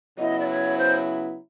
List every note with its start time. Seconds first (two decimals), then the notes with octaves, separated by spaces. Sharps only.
0.18 C#3 F#3 B3 E4 D#5
0.40 D5
0.48 C#5
0.78 C5